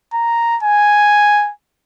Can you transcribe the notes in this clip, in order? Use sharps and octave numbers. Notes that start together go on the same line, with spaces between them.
A#5
G#5